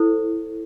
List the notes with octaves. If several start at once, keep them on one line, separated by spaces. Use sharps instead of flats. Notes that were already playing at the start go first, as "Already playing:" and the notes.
Already playing: E4 A4 C5